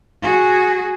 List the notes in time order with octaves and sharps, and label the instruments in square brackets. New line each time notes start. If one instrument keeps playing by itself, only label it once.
[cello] F#4 G#4